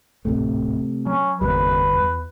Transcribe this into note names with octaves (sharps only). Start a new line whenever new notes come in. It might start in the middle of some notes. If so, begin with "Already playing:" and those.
D1 G#1 A2 C3 A3
F#3 C#4
G1 E2 C3 G3 A#3 B4
E2